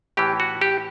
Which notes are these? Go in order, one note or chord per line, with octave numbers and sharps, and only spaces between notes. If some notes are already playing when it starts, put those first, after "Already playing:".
A2 E3 G4
F#4
G4